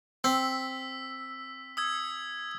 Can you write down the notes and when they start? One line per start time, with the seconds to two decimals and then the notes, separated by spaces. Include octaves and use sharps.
0.24 C4 E6 B6
1.77 D#6 E6 G#6